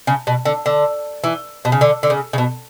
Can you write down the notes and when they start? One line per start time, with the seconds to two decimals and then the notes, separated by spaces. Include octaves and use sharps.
0.07 C#3
0.27 B2
0.45 D3
0.66 D3
1.24 E3
1.65 B2
1.72 C#3
1.81 D3
2.03 D3
2.10 C#3
2.33 C#3
2.38 B2